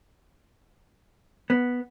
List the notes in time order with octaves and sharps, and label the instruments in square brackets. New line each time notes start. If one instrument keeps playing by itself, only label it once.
[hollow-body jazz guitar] B3